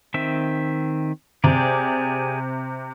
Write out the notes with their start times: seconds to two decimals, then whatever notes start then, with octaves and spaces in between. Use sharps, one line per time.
0.14 D#3 C4 E5
1.44 C3 G4 G#4 D5